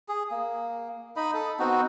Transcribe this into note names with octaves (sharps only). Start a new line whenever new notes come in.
G#4
A#3
D#4 D#5 B5
A4
B3 C4 D#4 F#4